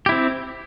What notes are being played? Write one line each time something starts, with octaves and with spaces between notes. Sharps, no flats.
C4 E4 G4